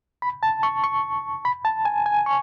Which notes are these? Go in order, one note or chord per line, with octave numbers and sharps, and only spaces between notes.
B5
A5
C#6
C#6
B5
A5
G#5
G#5
C#6